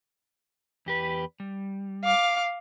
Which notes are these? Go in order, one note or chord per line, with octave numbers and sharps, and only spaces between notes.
E2 G4 B4
G3
F5 D6